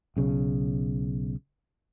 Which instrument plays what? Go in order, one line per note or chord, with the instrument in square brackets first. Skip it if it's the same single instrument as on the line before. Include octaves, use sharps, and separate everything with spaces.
[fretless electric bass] B1 C#3